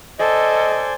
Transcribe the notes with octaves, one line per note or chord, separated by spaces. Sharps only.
A4 C5 D5 D#5 G#5